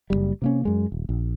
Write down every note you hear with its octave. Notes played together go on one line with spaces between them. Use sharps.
F#1 D#2 G3
C3 A#3 C#4
F#2 G#3
D#1
A#1